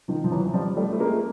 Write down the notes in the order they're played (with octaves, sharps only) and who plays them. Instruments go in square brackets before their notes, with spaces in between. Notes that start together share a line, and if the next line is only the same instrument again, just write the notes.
[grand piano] D#3 F3
F3
E3 F#3
F3 G3
G3 A3
A3
G#3 A#3